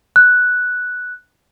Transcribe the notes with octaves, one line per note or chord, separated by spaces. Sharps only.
F#6